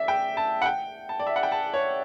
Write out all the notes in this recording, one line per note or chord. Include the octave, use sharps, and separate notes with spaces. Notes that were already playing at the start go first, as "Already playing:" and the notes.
Already playing: D5 E5
G5
A5
F#5
G5
A5
D5
E5
F#5
G5
A5
C#5